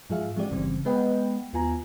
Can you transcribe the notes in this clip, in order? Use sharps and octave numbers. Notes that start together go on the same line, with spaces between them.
G#2 F3 F4 G#4 E5 F5
F3 G#3 C4 F#4 G4 D5
G1 C#3 E3 G3 C4
G#3 B3 B4 D#5 F#5 G5
D#2 B3 F4 G#5 A#5